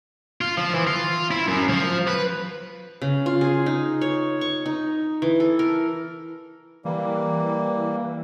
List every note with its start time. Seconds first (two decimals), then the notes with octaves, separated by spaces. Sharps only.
0.41 F4
0.57 F3
0.74 E3
0.87 F4
1.31 E4
1.48 F#2
1.69 F3
2.08 B4
3.02 C#3
3.26 F4
3.41 G#4
3.66 D#4
4.01 C#5
4.41 C#6
4.66 D#4
5.22 E3
5.40 A4
5.59 A#4
6.85 E3 G3 A#3